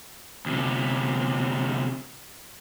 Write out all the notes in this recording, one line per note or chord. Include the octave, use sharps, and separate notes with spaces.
D2 C3